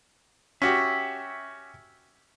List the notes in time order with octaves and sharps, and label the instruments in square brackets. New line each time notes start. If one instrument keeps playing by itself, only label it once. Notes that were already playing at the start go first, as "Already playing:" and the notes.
[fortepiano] C#4 F#4 G4 [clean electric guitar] E5